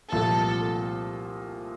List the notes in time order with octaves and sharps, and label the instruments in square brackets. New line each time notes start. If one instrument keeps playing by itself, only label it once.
[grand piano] C2 A#2 F3 A3 C4 [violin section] A4